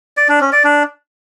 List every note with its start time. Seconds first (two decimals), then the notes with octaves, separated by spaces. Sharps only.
0.17 D5
0.29 D4
0.41 C#4
0.53 D5
0.64 D4